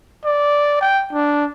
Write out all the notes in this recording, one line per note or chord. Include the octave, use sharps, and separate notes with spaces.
D5
G5
D4